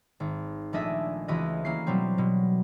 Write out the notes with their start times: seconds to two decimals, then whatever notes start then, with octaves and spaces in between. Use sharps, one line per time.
0.20 G#1
0.73 A#1 A3 D4 D#5 E5 G#5
1.28 C#2 E3 F#4 B4 D#5
1.65 E3 A#3 C#4 C7
1.87 B2 F#3 G3 C4
2.18 B2